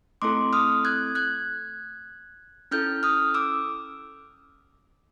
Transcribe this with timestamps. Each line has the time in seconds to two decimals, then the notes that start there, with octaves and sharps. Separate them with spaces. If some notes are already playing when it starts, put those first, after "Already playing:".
0.22 A3 C4 E4 A4 C6 D6
0.53 D#6 F6
0.85 F#6 G#6
1.15 F#6 G#6
2.71 C#4 E4 A4 F6 G6
3.03 D#6 F6
3.34 D6 E6